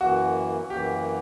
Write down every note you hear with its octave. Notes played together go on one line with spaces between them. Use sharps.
F#2 E3 A#3 F#4
F#2 E3 A#3 G4